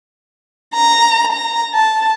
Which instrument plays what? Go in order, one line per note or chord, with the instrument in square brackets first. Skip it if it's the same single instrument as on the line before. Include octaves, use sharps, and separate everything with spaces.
[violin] A#5
A#5
A5